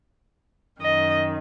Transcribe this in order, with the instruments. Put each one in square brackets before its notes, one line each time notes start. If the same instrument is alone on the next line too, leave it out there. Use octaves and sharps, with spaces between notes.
[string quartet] F#2 D#3 D#5